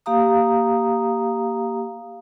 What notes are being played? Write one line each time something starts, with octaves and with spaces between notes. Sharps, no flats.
A#3 G4 F5 A#5 D#6